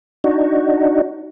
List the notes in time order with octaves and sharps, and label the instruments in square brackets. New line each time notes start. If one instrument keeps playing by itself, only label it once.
[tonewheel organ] D4 D#4 F#4